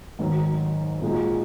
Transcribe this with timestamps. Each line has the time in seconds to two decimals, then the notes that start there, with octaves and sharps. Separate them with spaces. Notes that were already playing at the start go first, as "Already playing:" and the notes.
0.19 G#1 G#2 D#3 F#3
1.02 A#1 A#2 G#3 D#4 F#4